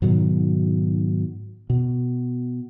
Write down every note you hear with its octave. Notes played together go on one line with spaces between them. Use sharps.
G#2 B2 D#3 F#3
B2